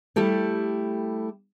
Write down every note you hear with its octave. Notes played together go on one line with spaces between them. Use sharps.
G3 A3 E4 G4 A4